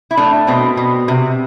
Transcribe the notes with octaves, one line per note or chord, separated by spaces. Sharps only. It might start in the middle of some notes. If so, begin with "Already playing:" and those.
E4
A3 D4
B2 C4
B2
C3